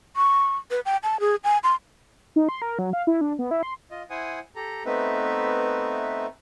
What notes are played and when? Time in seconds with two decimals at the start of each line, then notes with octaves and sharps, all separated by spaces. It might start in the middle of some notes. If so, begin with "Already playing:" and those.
0.16 C#6
0.71 B4
0.86 G5
1.03 A5
1.20 G#4
1.44 G#5
1.64 C6
2.36 D#4
2.49 C6
2.62 A#4
2.79 F#3
2.93 F5
3.07 E4
3.21 D4
3.39 B3
3.51 E4
3.63 C6
3.91 F4 D#5
4.10 E4 C5 F#5 G#5 D#6
4.56 G4 A4 A#5
4.86 A3 B3 C4 D#4 B4 E5